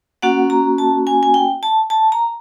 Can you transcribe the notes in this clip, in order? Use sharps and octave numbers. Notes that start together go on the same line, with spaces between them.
A#3 C#4 F#4 F#5
A#5
A5
G#5
G#5
G5
A5
A5
A#5